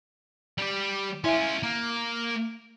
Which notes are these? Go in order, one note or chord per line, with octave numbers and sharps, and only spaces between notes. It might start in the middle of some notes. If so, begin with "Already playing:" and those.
G3 G4
C#4 E4 F4 E5 G#5
A#3